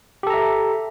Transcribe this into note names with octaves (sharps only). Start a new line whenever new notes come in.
G4 A4 E5 A#5